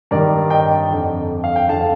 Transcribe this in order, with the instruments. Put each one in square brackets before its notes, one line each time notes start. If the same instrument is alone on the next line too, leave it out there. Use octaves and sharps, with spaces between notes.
[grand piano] G2 D#3 A#4 D5
D#5 G5
F2 D3
F5
G5
F2 D3 F5 A5